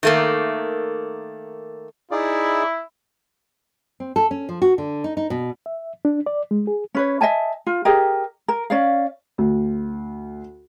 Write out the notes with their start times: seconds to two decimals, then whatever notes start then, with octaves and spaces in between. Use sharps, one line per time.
0.03 D#3 A3 A#3
2.11 D#4 E4 G#4 D5
4.00 C4
4.16 A4
4.31 C#4
4.49 F3
4.62 F#4
4.78 D3
5.04 D#4
5.17 D#4
5.30 B2
5.66 E5
6.05 D4
6.26 D5
6.51 G#3
6.67 G#4
6.95 C#4 B4 C#5
7.21 D#5 E5 G#5 A5
7.67 F4
7.85 G4 G#4 A#4 D#5
8.48 A#4
8.70 C#4 D5 F5
9.38 D2